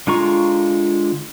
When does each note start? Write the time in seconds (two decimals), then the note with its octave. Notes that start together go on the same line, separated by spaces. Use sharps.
0.07 D3 G#3 F4 A#5 C#6